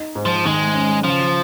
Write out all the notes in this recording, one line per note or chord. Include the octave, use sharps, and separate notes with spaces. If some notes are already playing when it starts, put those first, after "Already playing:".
Already playing: D#4
G#2
F3
D#3 G#3
C#4
C#3 F3